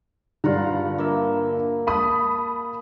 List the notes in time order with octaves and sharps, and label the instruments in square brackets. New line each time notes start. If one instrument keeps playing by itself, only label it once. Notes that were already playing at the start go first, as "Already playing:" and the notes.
[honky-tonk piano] G2 D3 [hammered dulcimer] F4 F#5 A#5
[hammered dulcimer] A#3 E5
[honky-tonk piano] A5 B5 D#6